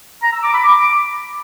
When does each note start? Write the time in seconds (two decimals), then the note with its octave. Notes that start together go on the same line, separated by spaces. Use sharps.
0.23 A#5
0.33 E6
0.43 D6
0.54 B5
0.64 D6